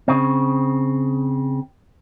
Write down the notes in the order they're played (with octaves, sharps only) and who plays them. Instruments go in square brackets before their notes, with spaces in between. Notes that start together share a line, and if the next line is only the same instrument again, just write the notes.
[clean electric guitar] C#3 C4